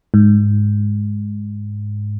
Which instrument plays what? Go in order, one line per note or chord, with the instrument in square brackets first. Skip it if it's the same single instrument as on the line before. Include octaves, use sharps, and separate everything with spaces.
[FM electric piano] G#2